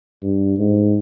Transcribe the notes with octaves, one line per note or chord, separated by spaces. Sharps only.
G2
G#2